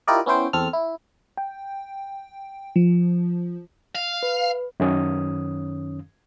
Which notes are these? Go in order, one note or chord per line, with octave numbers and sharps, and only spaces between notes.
E4 F4 G4 A#4 D5 D#5
B3 C#4 E4 C5 G5
E2 C4 A4 F6
E4
G5
F3
F5
B4
F#2 D#3 C#4 D#6